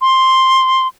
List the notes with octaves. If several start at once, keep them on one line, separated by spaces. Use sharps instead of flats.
C6